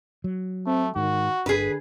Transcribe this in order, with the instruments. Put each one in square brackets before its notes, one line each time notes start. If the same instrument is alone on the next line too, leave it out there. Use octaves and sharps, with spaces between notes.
[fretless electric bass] F#3
[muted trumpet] A3 [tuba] C4
[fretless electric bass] G#2 [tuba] D#3 [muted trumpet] F#4
[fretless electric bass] G1 [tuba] D3 [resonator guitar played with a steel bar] G#4 B4